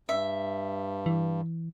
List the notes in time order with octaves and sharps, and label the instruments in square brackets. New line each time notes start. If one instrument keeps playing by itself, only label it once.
[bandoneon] G2 [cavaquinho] E5
[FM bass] E3